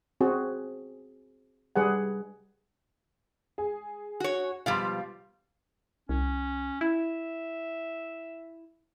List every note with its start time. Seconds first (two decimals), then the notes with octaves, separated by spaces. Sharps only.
0.21 C4 F#4 G#4
1.76 G3 G#4 B4 F#5
3.58 G#4
4.20 F#4 C#5
4.66 B2 F3 G3 F5 C6
6.09 C2 C#4
6.81 E4 E5